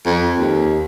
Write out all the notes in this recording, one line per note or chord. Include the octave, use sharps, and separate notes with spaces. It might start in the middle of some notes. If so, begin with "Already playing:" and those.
F2
D#2